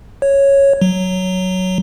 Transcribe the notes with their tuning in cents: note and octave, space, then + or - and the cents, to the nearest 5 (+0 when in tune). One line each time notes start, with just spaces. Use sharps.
C#5 -5
F#3 +5